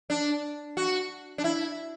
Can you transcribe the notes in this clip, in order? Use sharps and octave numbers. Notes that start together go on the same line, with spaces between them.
D4
F#4
D4
E4